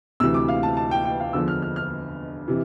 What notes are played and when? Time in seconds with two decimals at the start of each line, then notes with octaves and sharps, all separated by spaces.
0.20 D2 C3 E3 E6
0.34 D6
0.49 F5
0.63 A5
0.77 A5
0.91 G5
1.05 G5
1.20 F5
1.33 E2 D3 F3 E6
1.48 F6
1.62 F6
1.76 F6
2.48 C3 E3